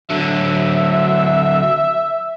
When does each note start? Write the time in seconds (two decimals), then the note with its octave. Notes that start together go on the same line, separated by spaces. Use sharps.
0.10 D3 F#3 E5